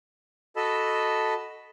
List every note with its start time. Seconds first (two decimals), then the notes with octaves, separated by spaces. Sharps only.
0.56 F#4 A4 D#5 A5 B5 E6